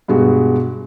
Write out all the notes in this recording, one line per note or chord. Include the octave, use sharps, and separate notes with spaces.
G2 B2 G#3 F#4